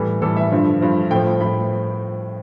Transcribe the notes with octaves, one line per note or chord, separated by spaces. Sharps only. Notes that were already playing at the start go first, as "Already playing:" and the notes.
Already playing: A2 E3 G3
A2 E3 G3 A4
E5
G2 D3 F3
G2 D3 F3
A2 F3 G5
A2 F3 B5